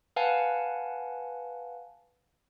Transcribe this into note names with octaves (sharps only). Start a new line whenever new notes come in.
B4 F5 F#5 G#5 A5